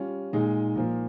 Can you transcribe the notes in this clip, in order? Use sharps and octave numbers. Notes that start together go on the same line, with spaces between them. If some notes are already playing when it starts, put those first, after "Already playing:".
Already playing: G3 C#4 F4
A#2 G#3 D#4 G#4
A#2 F3 A#3